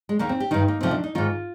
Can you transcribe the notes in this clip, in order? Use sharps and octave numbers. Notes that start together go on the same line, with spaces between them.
G#3
D#2 D#3 A#3
C4
G4
G2 D#3 D#4
A#3
D2 C3 F3 C4
D4
D#4
G#2 D#3 F4